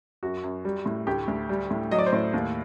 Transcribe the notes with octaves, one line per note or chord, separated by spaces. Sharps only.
F#2 F#4
F#2
G3
A2
D2 G4
D2
G3
A2
F#3 D#5
D5
C5
A2 D5
D#2